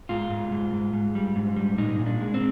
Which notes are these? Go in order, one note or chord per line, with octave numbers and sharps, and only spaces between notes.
G#2 F4
G#2
G#2
G#2
G#2
G3
G#2
G3
A#2 D#4
A#2
D4
G#3
C4